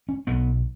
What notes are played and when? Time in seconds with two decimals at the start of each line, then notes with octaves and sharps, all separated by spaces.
0.09 C#4
0.27 B1 B3